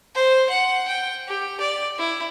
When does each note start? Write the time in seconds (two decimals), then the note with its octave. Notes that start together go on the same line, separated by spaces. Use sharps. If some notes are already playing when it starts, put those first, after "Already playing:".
0.15 C5
0.49 F#5
0.87 G5
1.28 G4
1.60 D5
1.98 E4